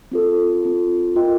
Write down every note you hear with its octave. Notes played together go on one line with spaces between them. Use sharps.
C4 F4 A4
C4 F4 A4
F4 A#4 D#5 G5